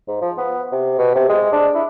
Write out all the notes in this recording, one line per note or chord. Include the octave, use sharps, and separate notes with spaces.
G#2
F3
B3
C3
B2
C3
G#3
D4
E4